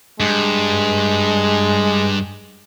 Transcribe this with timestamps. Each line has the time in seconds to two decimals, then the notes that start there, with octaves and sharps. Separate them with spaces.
0.20 G2 G#3